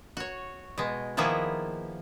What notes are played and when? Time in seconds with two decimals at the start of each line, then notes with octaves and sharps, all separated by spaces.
0.17 F#4 C#5
0.78 B2 G#3
1.17 D#3 F3 A#3 B3 E4 G#4